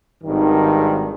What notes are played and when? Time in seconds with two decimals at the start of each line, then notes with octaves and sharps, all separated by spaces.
0.22 G#1 G2 D#3